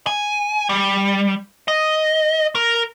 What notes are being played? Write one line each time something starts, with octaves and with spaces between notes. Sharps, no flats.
G#5
G3
D#5
A#4